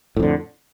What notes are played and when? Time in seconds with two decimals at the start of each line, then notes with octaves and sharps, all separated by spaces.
0.17 A2
0.20 F2
0.23 D3